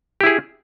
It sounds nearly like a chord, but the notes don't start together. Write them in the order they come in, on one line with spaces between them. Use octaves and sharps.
G4 E4 G#4